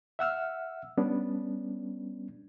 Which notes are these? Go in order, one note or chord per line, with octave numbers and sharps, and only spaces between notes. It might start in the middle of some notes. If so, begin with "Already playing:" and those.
E5 F#5 E6 F6
G3 B3 C#4 D4